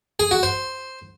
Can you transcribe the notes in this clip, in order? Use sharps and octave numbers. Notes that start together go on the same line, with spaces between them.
G#4
F#4
C5